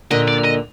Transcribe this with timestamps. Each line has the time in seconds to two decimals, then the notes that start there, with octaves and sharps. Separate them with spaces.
0.11 A#2 D3 D#5
0.28 D5
0.45 D#5